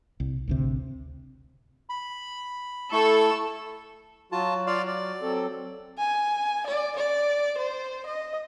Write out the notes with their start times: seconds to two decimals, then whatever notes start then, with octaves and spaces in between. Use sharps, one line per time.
0.20 C2
0.48 A1 D2 C3
1.89 B5
2.92 A3 E4 A4 C#6 E6
4.32 F#3 F4 F#4 A5
4.67 F4 D5 F5
4.87 D5
5.22 F#3 C4 A4
5.98 G#5
6.67 D5
6.97 D5
7.58 C5
8.06 D#5